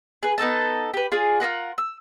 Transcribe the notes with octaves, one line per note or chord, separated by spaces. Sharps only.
G#4 B4
B3 D#4 A4 A5
G4 B4
F4 G#4 D5
F4 G#4 A#4 F#5
E6